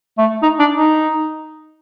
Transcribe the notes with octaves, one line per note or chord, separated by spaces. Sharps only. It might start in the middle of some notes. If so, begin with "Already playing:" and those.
A3
D#4
D4
D#4